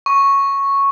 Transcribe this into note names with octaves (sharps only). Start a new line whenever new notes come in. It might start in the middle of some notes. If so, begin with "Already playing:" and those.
C#6